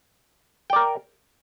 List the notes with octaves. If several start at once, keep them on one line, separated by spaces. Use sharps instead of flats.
A#4 D5 G5